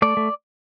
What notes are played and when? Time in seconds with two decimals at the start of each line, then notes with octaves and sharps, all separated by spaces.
0.02 A3 D5
0.17 A3